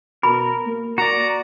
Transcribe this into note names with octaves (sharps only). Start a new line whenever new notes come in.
B2 A#4 B5
A#3
F#4 D5 A#5